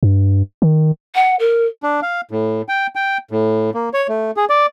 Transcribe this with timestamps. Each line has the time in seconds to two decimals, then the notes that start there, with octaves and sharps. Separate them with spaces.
0.03 G2
0.62 D#3
1.15 F#5
1.39 A#4
1.83 D4
2.02 F5
2.31 A2
2.69 G5
2.95 G5
3.31 A2
3.74 A#3
3.94 C#5
4.09 A3
4.37 G#4
4.50 D5